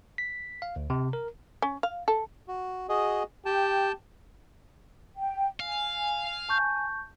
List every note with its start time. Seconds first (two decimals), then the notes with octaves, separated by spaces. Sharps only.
0.18 B6
0.62 F5
0.76 D2
0.90 C3
1.13 A#4
1.62 C#4
1.83 F5
2.08 A4
2.48 F#4
2.89 F#4 G#4 D#5
3.46 G4 G5 A5
5.17 G5
5.60 F5 G#5
6.49 A5 C#6 G6